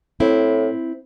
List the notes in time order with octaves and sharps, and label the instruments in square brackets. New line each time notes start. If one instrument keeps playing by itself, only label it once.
[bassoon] A2 [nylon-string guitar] C4 E4